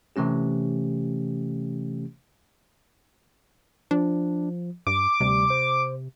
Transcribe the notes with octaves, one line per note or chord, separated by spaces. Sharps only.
C3 E3 A3 C#4 G4
F3 D4
G2 D6
D2 C3 G3
C5